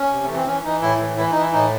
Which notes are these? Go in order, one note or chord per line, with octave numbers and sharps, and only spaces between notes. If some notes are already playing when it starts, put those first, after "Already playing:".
Already playing: C#4
C3
E3 A3
C4
E3 C#4
E3 D#4
A2 E4
E3
E3 E4
E3 D#4
E4
A2 D#4